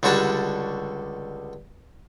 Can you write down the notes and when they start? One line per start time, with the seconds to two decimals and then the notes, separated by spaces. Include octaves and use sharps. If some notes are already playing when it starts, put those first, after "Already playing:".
0.03 C#2 D3 G3 F#4 C#5 A5